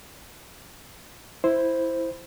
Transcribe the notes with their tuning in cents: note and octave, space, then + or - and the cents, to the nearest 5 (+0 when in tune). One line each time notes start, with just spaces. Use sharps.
E4 +0 C5 +0